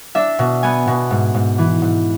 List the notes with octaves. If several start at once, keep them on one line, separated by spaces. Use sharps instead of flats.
D4 E5
B2
B3 G#5
B2
G#2
G#2
E3
G#2